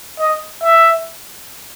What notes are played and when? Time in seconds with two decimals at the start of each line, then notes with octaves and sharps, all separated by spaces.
0.19 D#5
0.64 E5